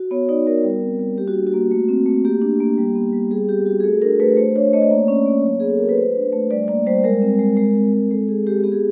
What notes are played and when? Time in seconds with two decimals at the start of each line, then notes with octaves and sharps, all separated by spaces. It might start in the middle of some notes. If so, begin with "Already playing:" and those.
Already playing: F#4
0.11 B3 C#5
0.29 D#4 D5
0.47 B3 A#4
0.64 G3
0.82 C4
1.00 G3
1.17 A#3 G4
1.27 F#4
1.35 D4
1.47 F#4
1.54 A#3
1.71 A3
1.89 C4
2.06 A3
2.25 A#3 G4
2.42 D4
2.60 A#3
2.78 G3
2.95 B3
3.13 G3
3.31 G3 G#4
3.48 C4 G4
3.66 F#4 G#4
3.80 G#4
3.84 A3 A4
4.02 D4 A#4
4.20 A3 B4
4.37 A3 C5
4.56 D4 C#5
4.73 A3 D#5
4.82 D5
4.91 A#3 C#5
5.08 C#4
5.26 A#3
5.44 F#3
5.60 B3 G#4
5.70 A4
5.79 F#4 A#4
5.89 B4
5.97 A3 C5
6.16 D4
6.33 A3
6.51 G3 D5
6.68 A#3 D5
6.86 G3 C5
7.04 G#3 A#4
7.22 C4
7.39 G#3
7.57 G#3
7.75 C4
7.93 G#3
8.11 G#3 A4
8.29 C4 G#4
8.46 G#3 G4
8.64 B3 G4
8.72 G#4